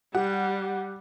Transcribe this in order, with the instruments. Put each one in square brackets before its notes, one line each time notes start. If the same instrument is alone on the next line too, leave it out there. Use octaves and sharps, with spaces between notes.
[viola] G3 [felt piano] G4 [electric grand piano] F#5